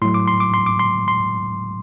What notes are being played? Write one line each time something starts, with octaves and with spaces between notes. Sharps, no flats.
A2 F#3 C6
D6
C6
D6
C6
D6
C6
C6